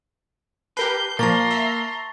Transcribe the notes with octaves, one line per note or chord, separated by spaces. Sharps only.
G4 A#4 B4 A5 G6 C7
A#2 F3 A#3 A5 A#5 C6 C#6 A6
E5